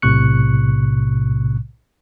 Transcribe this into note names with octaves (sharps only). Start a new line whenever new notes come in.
B1 A2 C3 C#6 F#6 C#7